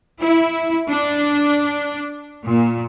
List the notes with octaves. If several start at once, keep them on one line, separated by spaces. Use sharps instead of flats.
E4
D4
A#2